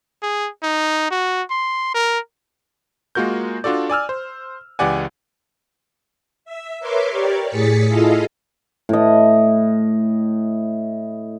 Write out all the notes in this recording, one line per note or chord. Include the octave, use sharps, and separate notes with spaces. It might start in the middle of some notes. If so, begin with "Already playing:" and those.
G#4
D#4
F#4
C6
A#4
G#3 A#3 F4 F#4 A#4 G6
D4 F4 F#4 A4 D5
D5 G#5 E6 F6
C5
C#2 E3 G4 D5 F#5 G#5
E5
A#4 B4 C#5 E5 C6 D6
G4 A#4 C#5 D5
A2 G#4 A6 B6 C#7
E4 F4 G#4 A4 D#5 F5
A2 D#5